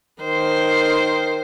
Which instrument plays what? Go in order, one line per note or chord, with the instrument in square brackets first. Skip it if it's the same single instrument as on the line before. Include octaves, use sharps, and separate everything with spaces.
[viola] D#3 C5